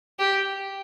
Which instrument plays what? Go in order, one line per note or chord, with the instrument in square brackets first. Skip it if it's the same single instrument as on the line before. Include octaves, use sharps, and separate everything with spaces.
[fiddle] G4